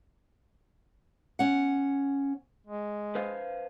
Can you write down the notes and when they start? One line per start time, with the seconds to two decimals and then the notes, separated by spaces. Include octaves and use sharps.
1.39 C#4 F#5
2.67 G#3
3.15 B4 C5 F5